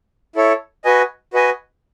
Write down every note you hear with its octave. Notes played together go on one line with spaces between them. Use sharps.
E4 A4 C#5
F#4 B4 D#5 G#5
F#4 B4 D#5 G#5